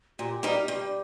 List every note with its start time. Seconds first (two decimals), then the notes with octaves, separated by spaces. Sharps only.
0.19 A#2 G4
0.43 G3 A#3 D#4
0.68 G2 G4